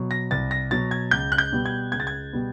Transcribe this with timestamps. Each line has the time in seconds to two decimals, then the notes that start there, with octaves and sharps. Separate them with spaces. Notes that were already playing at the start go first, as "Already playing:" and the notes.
Already playing: B2 F#3
0.11 A#6
0.31 C2 A6
0.51 A#6
0.71 B2 F#3 A6
0.91 G#6
1.11 C#2 G6
1.32 F#6
1.38 G6
1.52 B2 G3 B3
1.65 G#6
1.92 C#2 G#6
2.00 A6
2.07 G#6
2.33 B2 G3 B3